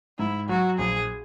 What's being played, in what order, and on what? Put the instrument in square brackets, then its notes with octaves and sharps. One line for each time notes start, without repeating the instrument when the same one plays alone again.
[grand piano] G#2 [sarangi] E4
[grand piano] F#3 [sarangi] F#4
[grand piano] A#1 [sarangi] G#4